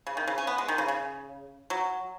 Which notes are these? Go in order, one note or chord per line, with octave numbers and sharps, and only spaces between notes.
C#3
D#3
C#3
C#4
B3
G#3
D#3
C#3
C#3
F#3